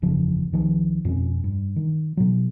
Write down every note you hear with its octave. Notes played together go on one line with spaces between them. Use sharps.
F#1 E2 C#3 F3
C#2 D#3 F3
F2 B2 C#4
G2
D#3
B2 F#3